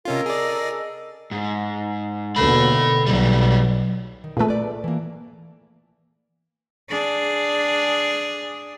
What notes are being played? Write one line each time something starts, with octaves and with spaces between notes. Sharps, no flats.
C3 C#4 F4 A4 A#4 D#5
G#4 D5
G#2
D#2 B2 D3 A4 B5
B1 F#3 G3
D#3
A#2 A3 G#4 B4
B4 D5
E3 A#3
D4 G#4